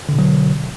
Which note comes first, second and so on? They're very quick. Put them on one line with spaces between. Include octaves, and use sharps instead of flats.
D3 B2 F#3